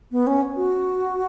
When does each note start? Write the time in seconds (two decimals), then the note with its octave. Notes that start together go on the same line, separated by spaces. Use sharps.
0.12 B3
0.27 C#4
0.57 F#4